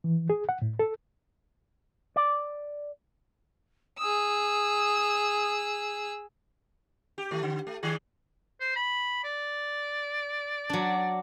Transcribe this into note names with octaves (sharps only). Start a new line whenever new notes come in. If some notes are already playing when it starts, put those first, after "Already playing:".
E3
G#4
F#5
A2
A4
D5
G#4 D#6 E6
G4
D#3 A3
D3
A3
D#3 G3 G#4
C5
B5
D5
F#3 D4